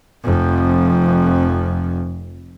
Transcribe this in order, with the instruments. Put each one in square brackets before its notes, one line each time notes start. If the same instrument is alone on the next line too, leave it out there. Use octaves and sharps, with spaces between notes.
[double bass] F1 F2